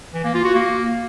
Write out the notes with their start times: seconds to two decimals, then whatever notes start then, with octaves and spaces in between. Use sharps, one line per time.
0.14 E3
0.24 A#3
0.35 F4
0.45 F#4
0.55 A#3